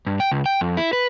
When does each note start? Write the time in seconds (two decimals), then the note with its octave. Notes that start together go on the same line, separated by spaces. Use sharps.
0.07 G2
0.20 G5
0.32 C#2
0.46 G5
0.61 F2
0.77 E4
0.93 B4